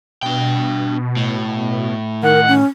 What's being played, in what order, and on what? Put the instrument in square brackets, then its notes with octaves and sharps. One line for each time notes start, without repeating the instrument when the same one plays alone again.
[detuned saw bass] B2 [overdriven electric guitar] D4 G5
[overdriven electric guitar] A2
[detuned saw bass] D#3 [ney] A#4 [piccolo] F#5
[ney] C#4